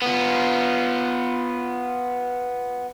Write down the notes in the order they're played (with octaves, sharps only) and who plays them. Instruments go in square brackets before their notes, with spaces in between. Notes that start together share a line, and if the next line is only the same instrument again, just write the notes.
[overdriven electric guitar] B3 F4